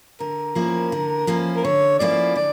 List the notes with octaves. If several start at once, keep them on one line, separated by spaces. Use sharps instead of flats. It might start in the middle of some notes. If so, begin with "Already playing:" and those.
D3 A#4
F3 A#3 C#4 E4
D3
F3 A#3 C#4 E4
A#4
D3 C#5
F3 A#3 C#4 E4 D5
D3 D5